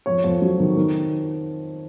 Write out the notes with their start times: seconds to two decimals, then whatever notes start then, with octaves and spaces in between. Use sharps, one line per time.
0.06 F2 C#5
0.24 F2
0.42 F#3
0.60 D#3
0.77 D#3